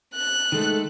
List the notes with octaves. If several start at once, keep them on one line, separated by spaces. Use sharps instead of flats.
F#6
D#3 G#3 A3 A4